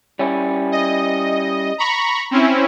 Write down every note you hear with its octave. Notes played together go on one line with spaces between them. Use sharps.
G3 C#4 E4
D#5
A#5 B5 C#6
C4 C#4 E4